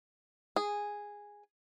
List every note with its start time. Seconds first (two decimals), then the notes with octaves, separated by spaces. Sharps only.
0.56 G#4